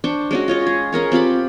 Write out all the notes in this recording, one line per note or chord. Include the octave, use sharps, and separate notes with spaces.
D4 C5 G5 C#6
G#3 C#4 F#4
F4 C#5 D#5
G#4
C#4 G#4 A#4 C#5
C4 F4 G4 B5